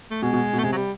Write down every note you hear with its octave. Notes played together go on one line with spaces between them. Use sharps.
A3
B2 G#3
B2
B2
A3
C3 G#3
F#3
G3